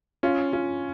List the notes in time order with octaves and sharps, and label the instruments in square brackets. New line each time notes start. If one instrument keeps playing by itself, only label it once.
[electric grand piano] C#4 [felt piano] F4
[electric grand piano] C#4 [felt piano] F4